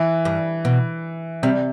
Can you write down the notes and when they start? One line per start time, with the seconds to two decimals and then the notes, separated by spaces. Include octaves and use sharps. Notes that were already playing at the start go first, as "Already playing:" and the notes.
Already playing: E3
0.25 G2
0.65 B2
1.43 C3 G3